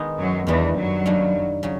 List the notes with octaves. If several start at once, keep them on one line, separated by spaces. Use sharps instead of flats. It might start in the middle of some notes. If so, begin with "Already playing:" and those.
Already playing: D#3 G#3 B3 D#4
F#2 F#3
E2 D#3 E3 G3 B3 D4
F#2 F#3
D#3 G3 A#3 D4
C#3 F#3